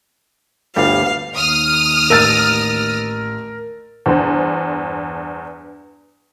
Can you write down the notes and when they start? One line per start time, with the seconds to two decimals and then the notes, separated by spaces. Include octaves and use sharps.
0.76 G1 D2 G3 F5
1.33 D#2 D#6 F6
2.10 A1 A#4 E6 A6
4.06 E2 G2 C5